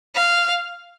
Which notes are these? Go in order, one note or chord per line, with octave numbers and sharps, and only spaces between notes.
F5